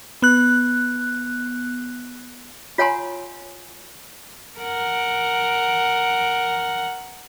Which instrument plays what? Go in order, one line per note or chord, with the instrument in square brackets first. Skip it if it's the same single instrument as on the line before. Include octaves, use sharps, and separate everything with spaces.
[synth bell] B3 F#6
[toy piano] F4 C#5 F#5 G#5 A#5 C6
[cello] A#4 F#5